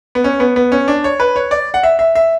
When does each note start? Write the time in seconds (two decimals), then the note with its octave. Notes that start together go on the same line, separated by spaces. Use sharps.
0.15 B3
0.24 C#4
0.40 B3
0.56 B3
0.72 C#4
0.88 D4
1.04 C#5
1.20 B4
1.36 C#5
1.51 D5
1.74 F#5
1.83 E5
1.99 E5
2.15 E5